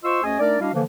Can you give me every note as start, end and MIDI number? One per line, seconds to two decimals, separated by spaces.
0.04 0.21 65
0.04 0.21 72
0.04 0.21 75
0.04 0.21 84
0.04 0.21 85
0.04 0.21 88
0.23 0.39 38
0.23 0.39 61
0.23 0.39 68
0.23 0.39 75
0.23 0.39 80
0.23 0.39 87
0.39 0.59 57
0.39 0.59 62
0.39 0.59 63
0.39 0.59 70
0.39 0.59 74
0.60 0.69 55
0.60 0.69 62
0.60 0.69 64
0.60 0.69 66
0.60 0.69 75
0.60 0.69 77
0.73 0.82 50
0.73 0.82 52
0.73 0.82 53
0.73 0.82 58